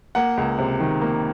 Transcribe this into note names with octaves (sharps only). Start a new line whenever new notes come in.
A#3 F#5
C#2
C3
D#3
A#3